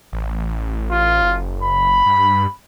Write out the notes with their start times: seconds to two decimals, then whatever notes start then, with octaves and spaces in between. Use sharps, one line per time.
0.13 A1
0.91 F4
1.22 F#1
1.63 B5
2.06 G2